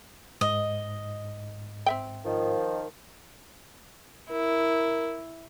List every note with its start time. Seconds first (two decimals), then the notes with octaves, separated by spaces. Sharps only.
0.41 G#2 D#5
1.86 C4 E5 G5
2.25 D#3 F3
4.31 E4 A#4